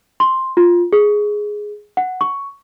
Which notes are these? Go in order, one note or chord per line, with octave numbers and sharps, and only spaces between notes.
C6
F4
G#4
F#5
C#6